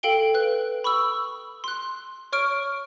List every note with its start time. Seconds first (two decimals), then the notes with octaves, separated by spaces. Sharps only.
0.03 A4 F5 G5 D7 G7
0.34 B4 F#6
0.84 B5 C#6 D#6 E6
1.64 C6 F#6
2.32 C#5 C#6 F6 D7